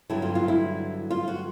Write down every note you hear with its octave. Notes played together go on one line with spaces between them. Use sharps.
G2 D3 F#3 E4
F4
F4
E4
F4
F#4